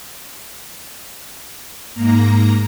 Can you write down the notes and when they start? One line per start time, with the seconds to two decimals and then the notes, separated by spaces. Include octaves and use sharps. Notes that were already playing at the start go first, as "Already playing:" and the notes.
1.94 G#2 A#3 A#5